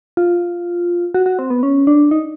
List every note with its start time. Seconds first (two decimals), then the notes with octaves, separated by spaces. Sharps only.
0.17 F4
1.14 F#4
1.26 F#4
1.39 C4
1.50 B3
1.63 C#4
1.87 D4
2.11 D#4